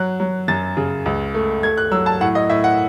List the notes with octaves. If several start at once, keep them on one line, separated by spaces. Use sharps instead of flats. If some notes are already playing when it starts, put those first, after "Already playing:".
Already playing: F#3 F#6
F#3
F#2 A6
C#3
C#2
A3
A3 G#6
F#6
F#3 E6
A5
A2 F#5
D#5
A2 E5
F#5